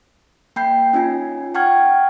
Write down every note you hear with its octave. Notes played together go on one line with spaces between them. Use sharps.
A#3 G5 B5 G6 C7
C#4 D#4 F4 G#5
F#5 G5 A5 C#6 F6 G#6